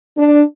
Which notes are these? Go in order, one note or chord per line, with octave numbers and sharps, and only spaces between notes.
D4